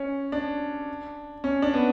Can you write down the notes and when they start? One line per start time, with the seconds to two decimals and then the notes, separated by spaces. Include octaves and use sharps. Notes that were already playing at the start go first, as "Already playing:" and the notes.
Already playing: C#4
0.32 D4
1.44 C#4
1.62 D4
1.74 B3